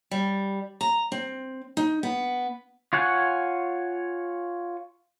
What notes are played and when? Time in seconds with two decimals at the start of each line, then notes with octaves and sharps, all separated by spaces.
0.11 G3
0.81 A#5
1.12 C4
1.77 D#4
2.03 B3
2.93 F4 C#5 F#5 G#5